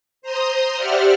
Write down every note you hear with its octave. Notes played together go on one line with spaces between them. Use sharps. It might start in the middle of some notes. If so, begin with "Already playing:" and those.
C5 A#5 C6 D#6
G4 C5 D5 E5 F#5 F6